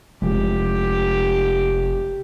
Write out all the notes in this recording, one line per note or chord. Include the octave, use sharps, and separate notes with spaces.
F1 E3 F3 G#3 G4